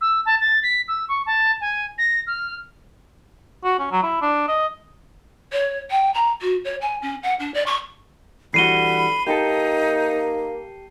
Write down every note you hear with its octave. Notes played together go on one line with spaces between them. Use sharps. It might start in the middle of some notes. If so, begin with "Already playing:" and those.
E6
A5
A6
B6
E6
C#6
A5
G#5
A#6
F6
F#4
C#4
F#3
E4
D4
D#5
C#5
G5
A#5
F#4
C#5
G#5
C#4
F#5
D4
D5
C#6
D3 E3 G3 F#4 B5 C7 D#7 G7
A#3 D#4 G4 A4